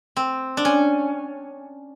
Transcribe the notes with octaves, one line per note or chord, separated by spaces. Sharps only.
C4
D4
C#4